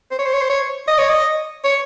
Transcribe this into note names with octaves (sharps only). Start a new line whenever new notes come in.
C5
C#5
C5
C#5
C5
C#5
D#5
C#5
D#5
C#5